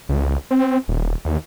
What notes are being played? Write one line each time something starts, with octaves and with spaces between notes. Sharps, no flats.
C#2
C4
D#1
D#2